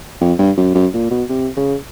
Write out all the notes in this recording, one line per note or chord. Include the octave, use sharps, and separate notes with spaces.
F2
G2
F#2
F#2
A#2
B2
C3
C#3